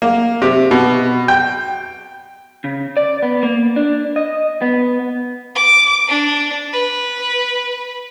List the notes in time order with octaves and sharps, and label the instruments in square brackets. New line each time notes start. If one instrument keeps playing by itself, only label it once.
[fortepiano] A#3
C3
B2
G5
[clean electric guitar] C#3
D5
B3
A#3
D4
D#5
B3
[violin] D6
D4
B4